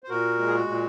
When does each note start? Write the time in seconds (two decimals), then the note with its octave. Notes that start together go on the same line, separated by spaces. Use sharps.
0.04 C5
0.09 A#2 F#4 A#4
0.38 G#3
0.47 G#4
0.54 F#4
0.68 A#2